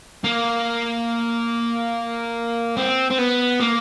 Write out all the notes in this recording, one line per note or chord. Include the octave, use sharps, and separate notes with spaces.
A#3
C4
C4
B3
A#3